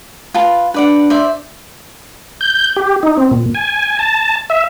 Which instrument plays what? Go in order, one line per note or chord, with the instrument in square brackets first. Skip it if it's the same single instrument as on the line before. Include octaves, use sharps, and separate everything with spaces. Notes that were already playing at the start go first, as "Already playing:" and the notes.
[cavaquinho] F4 B4 A5
[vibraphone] D4 [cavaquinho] B4 D5 F#5
[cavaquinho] C5 D5 E5
[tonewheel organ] G6
G4
D#4
C4
A#2
G#5
A5
E5